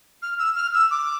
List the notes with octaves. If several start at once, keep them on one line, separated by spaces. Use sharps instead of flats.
F6
E6
F6
E6
D6